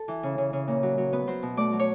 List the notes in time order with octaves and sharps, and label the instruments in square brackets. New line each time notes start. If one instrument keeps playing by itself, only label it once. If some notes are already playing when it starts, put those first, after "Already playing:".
Already playing: [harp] A4
E3
C#3
C#3
C#3
A#2
F#3
F#3
B3 B4
F#3 C5
B2
A3 D5
F#3
C#5